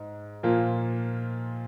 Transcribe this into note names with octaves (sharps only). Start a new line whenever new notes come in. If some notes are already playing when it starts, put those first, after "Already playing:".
Already playing: G#2
A#2 F3 A#3 F4